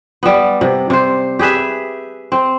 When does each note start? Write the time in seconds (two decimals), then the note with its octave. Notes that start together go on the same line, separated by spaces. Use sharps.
0.23 G3 B3
0.61 C3
0.90 C3 C5
1.39 G4 G#4 B4 E5
2.32 C4